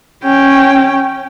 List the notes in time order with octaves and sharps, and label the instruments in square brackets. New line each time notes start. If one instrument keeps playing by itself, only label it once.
[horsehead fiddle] C#4 G5